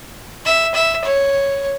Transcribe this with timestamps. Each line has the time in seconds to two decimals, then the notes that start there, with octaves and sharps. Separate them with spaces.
0.46 E5
0.74 E5
1.04 C#5